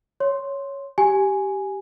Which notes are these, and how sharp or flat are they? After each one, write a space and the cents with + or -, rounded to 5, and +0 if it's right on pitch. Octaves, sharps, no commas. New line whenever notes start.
C#5 +0 C6 +0
G4 -10 G#5 +0